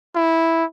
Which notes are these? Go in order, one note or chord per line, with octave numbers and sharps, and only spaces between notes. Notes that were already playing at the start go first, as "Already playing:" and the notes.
E4